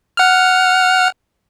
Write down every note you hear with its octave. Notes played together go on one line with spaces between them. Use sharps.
F#5 F6